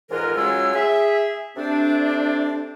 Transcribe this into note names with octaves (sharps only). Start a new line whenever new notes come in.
F2 G#2 E3 F4 A#4
C#3 F#3 G#3 F4 G#5 E6
G#4 E5
C3 A3 C4 D4